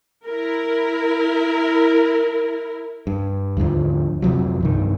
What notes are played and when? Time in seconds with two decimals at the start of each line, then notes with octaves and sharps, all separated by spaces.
0.26 E4 A#4
3.07 G2
3.57 D#2 G#2 D3 F3
4.22 F2 C3 F3 F#3
4.61 C2 G2 D#3